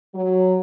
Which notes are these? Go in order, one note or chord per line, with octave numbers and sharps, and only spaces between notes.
F#3